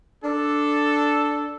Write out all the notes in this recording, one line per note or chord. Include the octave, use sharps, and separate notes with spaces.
D4 A4